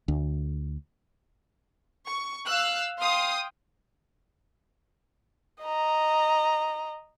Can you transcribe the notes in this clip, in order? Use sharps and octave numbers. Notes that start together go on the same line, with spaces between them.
D2
C#6
F5 E6 F#6
F5 G5 C6 D#6
D#5 A#5